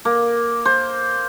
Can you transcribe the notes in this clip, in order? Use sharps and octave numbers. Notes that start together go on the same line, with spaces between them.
A#3
C5